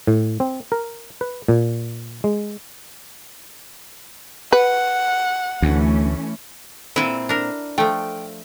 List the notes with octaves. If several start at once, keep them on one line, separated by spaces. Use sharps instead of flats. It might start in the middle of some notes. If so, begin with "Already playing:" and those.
A2
C4
A#4
B4
A#2
G#3
B4 F#5
D2 E3 A3 C#4
A#2 C4 E4 B4 E5
D4 A#4
F3 A3 G5